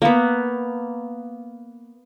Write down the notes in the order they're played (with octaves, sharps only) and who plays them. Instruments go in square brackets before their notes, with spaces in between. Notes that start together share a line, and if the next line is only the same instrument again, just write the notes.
[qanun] A#3 B3